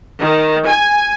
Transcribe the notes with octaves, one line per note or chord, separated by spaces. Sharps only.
D#3
G#5